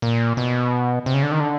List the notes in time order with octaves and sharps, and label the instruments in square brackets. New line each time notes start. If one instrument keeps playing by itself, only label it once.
[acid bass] A#2
B2
C3
C#3
D3
D#3
D3